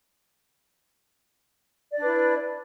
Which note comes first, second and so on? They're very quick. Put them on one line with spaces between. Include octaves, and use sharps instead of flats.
D5 D4 B4 E4